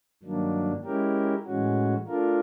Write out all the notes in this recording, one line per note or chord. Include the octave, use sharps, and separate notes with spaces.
G2 D#3 F#3 A#3 D4
G#3 C#4 E4 G4 A#4
A2 E3 G#3 C#4 F#4
A3 D4 F4 A#4